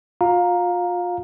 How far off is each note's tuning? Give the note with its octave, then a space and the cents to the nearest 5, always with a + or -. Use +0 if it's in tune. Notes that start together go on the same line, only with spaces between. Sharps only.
F4 +30 F5 +20 A#5 +0